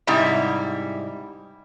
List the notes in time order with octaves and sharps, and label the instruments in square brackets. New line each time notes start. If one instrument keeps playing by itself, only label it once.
[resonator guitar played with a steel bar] G#2 C3 G3 E4